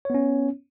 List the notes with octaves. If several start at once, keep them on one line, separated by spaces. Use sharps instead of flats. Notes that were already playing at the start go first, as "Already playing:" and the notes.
B3 C#4 C#5